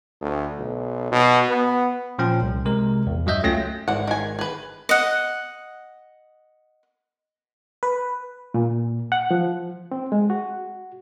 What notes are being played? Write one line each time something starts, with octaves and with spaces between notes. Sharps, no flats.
D2
B1
B2
B3
A#2 F3 C#4 G5
C2
C3 G#3 A#4
A#1 E2
G2 F#3 F#4 D#5 E5 G6
C#2 A3 C#4 F4 G5 A#6
G#1 E3 D5 F#5
D#3 G#5
G#4 B4
D#5 F#5
B4
A#2
F#5
F3
C4
G#3
F#4